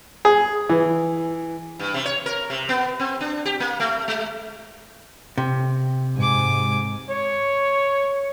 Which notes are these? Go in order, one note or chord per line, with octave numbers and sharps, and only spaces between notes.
G#4
E3
G2
C3
C#5
A#4
C3
B3
C4
D4
G4
A#3
A3
G#3
C3
G#2 G#5 D6
C#5